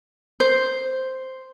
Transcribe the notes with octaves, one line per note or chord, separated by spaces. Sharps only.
C5